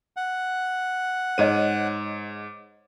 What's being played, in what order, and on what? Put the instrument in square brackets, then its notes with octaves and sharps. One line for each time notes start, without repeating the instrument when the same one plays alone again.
[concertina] F#5
[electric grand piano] G#2 D#7 [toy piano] C5 C#5 D#5